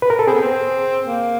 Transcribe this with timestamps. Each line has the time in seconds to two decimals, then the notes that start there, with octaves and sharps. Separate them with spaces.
0.02 B4
0.10 A#4
0.19 A4
0.27 C4 G#4
0.35 B3
0.42 C4
1.06 A#3